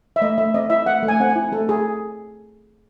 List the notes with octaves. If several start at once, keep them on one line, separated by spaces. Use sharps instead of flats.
E5
A3 D#5
A3 E5
C4 D#5
E4 E5
A3 F#5
A3
G#5
C4 F#5
G#5
E4
A3 A4
A3 G#4